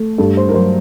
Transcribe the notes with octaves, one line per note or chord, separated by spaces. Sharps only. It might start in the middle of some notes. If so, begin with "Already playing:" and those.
Already playing: A3
G2 A4
C5
A#4
F#3 C5